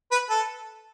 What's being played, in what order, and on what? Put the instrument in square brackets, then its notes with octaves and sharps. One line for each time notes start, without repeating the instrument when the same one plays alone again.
[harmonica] B4
A4